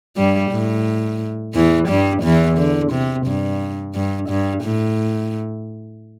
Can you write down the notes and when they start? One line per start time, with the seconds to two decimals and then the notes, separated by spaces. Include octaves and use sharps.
0.17 G2 G3
0.51 A2
1.55 E2 E3
1.88 G2 G3
2.23 E2 E3
2.58 D3
2.92 C3
3.26 G2
3.95 G2
4.29 G2
4.63 A2